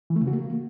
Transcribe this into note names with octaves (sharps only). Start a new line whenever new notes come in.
E3
A3
C#3
F#4
A#3